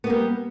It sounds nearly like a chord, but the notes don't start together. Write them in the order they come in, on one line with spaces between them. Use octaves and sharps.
B3 A#3 G3